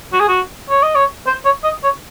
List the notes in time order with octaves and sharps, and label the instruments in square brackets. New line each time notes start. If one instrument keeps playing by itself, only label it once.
[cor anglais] F#4
G#4
F#4
C#5
D#5
C#5
C5
C#5
D#5
C#5